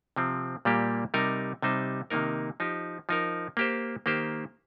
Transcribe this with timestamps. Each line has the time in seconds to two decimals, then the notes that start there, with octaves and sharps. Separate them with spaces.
0.16 C3 F3 C4
0.65 A#2 G3 A#3 G4
1.14 C3 G3 D#4 A#4
1.62 C3 G3 D#4 C5
2.10 C3 D#3 A#3 D#4 A#4
2.60 F3 D#4 G4
3.09 F3 D#4 A#4
3.57 A#3 G4 C5
4.06 D#3 A#3 G4 C5